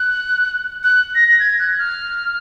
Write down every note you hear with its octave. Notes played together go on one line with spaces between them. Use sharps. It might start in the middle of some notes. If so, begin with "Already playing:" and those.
Already playing: F#6
F#6
A#6
A#6
G#6
F#6
F6